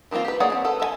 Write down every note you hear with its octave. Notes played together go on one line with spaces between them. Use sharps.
D#3 E3 A#3 C4 F4
G4 B4
A#3 G#4 C#5 D5 F#5
C4
A4 B4 F#5
A4 E5 G#5